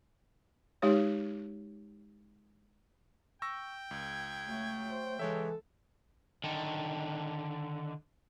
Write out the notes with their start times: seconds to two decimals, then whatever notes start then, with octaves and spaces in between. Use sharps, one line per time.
0.82 G#3 D#4 G4 C#5
3.42 G5 C#6 E6 A#6
3.91 C#2 G#6
4.48 F#3 A3
4.90 C5
5.19 C#3 E3 G#3 A4 C#5 E5
6.44 D3 D#3